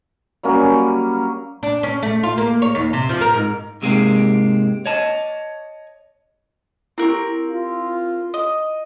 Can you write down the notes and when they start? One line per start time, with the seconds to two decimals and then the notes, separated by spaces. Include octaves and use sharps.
0.43 F#3 G3 A#3 C#4
1.63 D4
1.83 C#4
2.02 A3
2.23 F4
2.38 A#3
2.62 C#5
2.75 D#2
2.93 C3
3.09 F3
3.21 A#4
3.34 G#2
3.82 G#2 C3 G#3 A#3 C4
4.86 C#5 D#5 A5
6.98 C4 E4 G4 A#4
7.48 F4
8.34 D#5